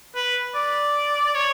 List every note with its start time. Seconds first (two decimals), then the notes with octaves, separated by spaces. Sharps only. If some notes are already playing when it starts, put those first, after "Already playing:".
0.16 B4
0.55 D5
1.35 C#5